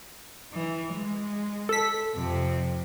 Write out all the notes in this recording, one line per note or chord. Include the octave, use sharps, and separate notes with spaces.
E3
G#3
A4 B6
F2 C3